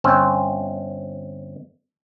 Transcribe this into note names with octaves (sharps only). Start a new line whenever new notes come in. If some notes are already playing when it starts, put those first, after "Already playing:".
G1 C4 C#4